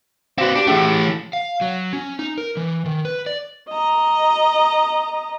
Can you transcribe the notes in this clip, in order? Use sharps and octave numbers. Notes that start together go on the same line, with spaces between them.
C4 F#4 B4 D5 F5
D4 G4
E3 A3 C#4 G#4 E6
F5
F#3
C#4
D#4
A#4
E3
D#3
B4
D5
D#5 A#5